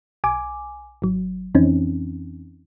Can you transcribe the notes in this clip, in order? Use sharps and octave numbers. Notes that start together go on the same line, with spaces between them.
B1 G#5 D6
G#1 F#3
F2 E3 C4 C#4 D#4